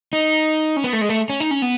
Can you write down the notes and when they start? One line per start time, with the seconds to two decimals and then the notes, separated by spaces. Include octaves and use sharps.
0.13 D#4
0.77 C#4
0.84 B3
0.93 A3
1.01 G#3
1.09 A3
1.30 C#4
1.40 D#4
1.51 C#4
1.62 B3